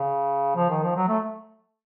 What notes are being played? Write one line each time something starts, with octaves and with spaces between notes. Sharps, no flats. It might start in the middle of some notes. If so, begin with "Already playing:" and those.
Already playing: C#3
F3
D#3
F3
F#3
A3